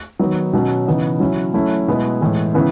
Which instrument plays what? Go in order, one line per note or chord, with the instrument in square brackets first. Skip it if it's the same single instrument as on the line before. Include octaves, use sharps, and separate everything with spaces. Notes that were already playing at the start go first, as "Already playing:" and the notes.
[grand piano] D#3 F#3 B3 D#4
B2 F#3 C#4
C#3 E3 B3 D#4
F#3 C#4 E4
F#3 A3 C#4 E4
B2 G#3 B3 E4
A2 E3 G#3
C#3 E3 B3 E4